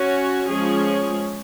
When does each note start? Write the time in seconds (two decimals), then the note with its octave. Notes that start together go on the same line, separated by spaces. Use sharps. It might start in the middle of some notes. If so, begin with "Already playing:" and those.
Already playing: C#4 F#4 C#5
0.48 F3 G#3 C#4 G#4 C#5